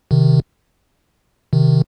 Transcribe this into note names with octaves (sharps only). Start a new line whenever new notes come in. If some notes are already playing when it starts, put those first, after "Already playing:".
C3 D#3
C3 D#3